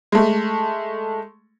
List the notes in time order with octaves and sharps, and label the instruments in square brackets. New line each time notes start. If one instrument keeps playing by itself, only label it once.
[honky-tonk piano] G#3 A3